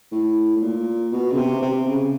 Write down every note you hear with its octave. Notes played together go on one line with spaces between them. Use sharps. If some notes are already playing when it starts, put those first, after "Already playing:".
A2
A2
A#2
B2
C#3
C3
C3
C#3